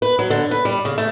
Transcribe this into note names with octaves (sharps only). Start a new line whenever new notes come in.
B4
F#3
D3
B4
G3
C#3
A3